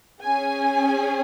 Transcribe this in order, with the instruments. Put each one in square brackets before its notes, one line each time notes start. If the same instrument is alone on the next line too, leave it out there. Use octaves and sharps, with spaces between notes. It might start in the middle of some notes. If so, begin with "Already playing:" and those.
[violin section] C#4 G#4 G#5